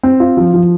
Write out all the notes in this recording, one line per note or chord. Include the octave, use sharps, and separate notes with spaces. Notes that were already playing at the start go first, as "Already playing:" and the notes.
C4
F4
F3
F3